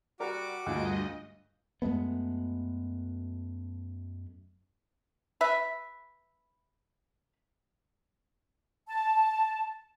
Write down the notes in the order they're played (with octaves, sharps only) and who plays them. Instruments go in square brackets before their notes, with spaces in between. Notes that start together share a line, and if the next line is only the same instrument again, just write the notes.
[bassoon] G3 [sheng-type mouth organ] F#4 D6 [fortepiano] A#4
[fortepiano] D2 F4 [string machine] G2 D#5 [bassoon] G#3
[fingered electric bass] F#2 G#3 A3 B3
[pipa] B4 E5
[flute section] A5